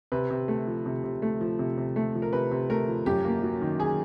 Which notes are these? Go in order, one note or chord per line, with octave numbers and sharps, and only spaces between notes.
C3 B4
C3
A3
F3
C3
C3
A3
F3
C3
C3
A3
F3
A#4
C3 B4
C3
A3 A#4
F3
F#2 G4
A#3
F#3
D#3
G#4